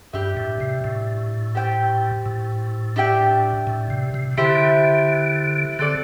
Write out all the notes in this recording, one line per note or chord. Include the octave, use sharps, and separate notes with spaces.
G2 D4 G4 E5
A2
C3
A2
G4 C5 G5
A2
D4 G4 E5 G5
A2
C3
C3
D3 E4 G4 C5 E5
D3 C4 A4 D5